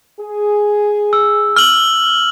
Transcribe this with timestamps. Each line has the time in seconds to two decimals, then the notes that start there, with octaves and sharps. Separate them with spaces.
0.20 G#4
1.13 E6
1.56 E6 F6 F#7